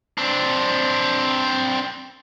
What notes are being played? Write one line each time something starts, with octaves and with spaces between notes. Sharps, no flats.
C4 D4